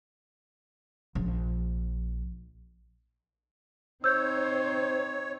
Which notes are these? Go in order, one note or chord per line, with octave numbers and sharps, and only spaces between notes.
A#1
C4 D#4 C5 C#5 E6 G6